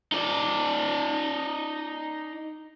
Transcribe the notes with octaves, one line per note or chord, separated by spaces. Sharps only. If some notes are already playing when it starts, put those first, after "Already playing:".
D#4 D5